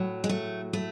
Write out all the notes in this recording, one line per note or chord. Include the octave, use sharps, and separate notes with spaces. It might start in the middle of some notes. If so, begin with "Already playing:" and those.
Already playing: A2 F#3
G#3
A3
A3